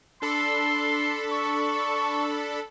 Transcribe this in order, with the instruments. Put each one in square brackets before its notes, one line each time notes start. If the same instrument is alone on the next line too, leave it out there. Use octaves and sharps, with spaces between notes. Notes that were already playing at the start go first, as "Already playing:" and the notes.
[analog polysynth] D4 A4 B5 [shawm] C6
[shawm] C#6